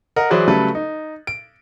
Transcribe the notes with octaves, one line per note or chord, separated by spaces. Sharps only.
A#4 D#5 F#5
E3 F#3 G#4 B4 C5 D5
C#3 F#3 G3 A3 A4 B4
D#4
D7